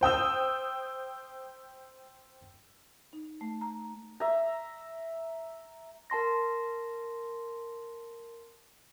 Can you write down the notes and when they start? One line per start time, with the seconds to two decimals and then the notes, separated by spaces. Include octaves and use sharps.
0.01 C5 G5 D#6 E6
3.13 D#4
3.41 A3
3.61 A#5
4.20 E5 A#5
6.10 A#4 A5 C6 A#6